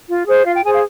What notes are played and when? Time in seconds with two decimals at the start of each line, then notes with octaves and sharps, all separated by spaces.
0.09 F4
0.27 G#4 C5
0.45 F4 F5
0.55 G5
0.64 G#4 C5 G#5
0.73 F5